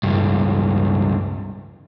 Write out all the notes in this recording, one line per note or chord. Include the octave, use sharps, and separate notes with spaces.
C#2 G2